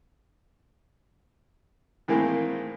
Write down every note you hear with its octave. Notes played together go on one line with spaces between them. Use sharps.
A2 D#3 E3 G#3 A#3 C4